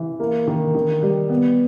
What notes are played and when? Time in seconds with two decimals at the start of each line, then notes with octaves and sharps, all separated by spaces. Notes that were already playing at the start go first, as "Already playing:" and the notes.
Already playing: E3
0.20 A#3
0.48 D#3
0.75 D#3
1.03 G3
1.30 B3